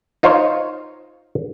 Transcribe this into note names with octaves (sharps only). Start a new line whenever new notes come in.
D#4 F4 C5 C#5